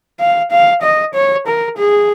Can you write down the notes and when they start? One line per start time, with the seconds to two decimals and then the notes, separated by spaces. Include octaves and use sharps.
0.20 F5
0.52 F5
0.82 D#5
1.14 C#5
1.47 A#4
1.78 G#4